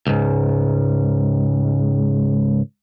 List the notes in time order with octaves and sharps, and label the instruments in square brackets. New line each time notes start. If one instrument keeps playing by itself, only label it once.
[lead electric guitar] C#2 G#2